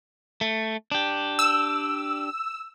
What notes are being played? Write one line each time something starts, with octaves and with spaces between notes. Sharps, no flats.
A3
D4 G4
E6